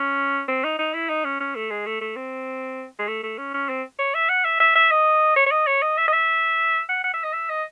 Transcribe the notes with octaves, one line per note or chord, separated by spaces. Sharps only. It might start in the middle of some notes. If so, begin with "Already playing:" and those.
Already playing: C#4
C4
D#4
D#4
E4
D#4
C#4
C#4
A3
G#3
A3
A3
C4
G#3
A3
A3
C#4
C#4
C4
C#5
E5
F#5
E5
E5
E5
D#5
C#5
C#5
D#5
C#5
D#5
E5
D#5
E5
F#5
F#5
E5
D#5
E5
D#5